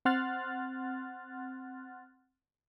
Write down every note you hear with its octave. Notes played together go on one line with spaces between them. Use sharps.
C4 F#5 C6 F6 F#6 A6